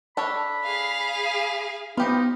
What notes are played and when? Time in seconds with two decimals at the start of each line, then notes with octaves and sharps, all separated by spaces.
0.17 D4 A4 C#5 B5
0.64 G#4 F5
1.97 B3 D#4 F4 G4 C5